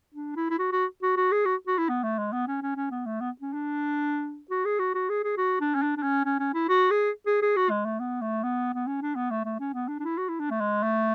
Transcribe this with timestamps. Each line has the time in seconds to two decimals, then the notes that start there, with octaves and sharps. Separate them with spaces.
0.14 D4
0.36 E4
0.50 E4
0.58 F#4
0.72 F#4
1.02 F#4
1.16 F#4
1.31 G#4
1.45 F#4
1.67 F#4
1.78 E4
1.89 B3
2.03 A3
2.18 G#3
2.32 B3
2.47 C#4
2.62 C#4
2.76 C#4
2.91 B3
3.06 A3
3.20 B3
3.41 C#4
3.53 D4
4.50 F#4
4.65 G#4
4.79 F#4
4.94 F#4
5.09 G#4
5.24 G#4
5.37 F#4
5.60 D4
5.75 C#4
5.82 D4
5.97 D4
6.03 C#4
6.25 C#4
6.39 C#4
6.54 E4
6.69 F#4
6.91 G#4
7.26 G#4
7.42 G#4
7.56 F#4
7.70 G#3
7.85 A3
8.00 B3
8.21 A3
8.43 B3
8.74 B3
8.87 C#4
9.02 D4
9.15 B3
9.30 A3
9.44 A3
9.60 C#4
9.73 B3
9.88 D4
9.99 D4
10.03 E4
10.17 F#4
10.29 E4
10.40 D4
10.50 A3
10.61 G#3
10.83 A3